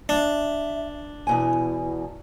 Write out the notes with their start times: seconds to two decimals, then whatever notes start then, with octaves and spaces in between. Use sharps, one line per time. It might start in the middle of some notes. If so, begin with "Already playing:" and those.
0.09 D4 E5
1.27 E2 B2 E4 G#5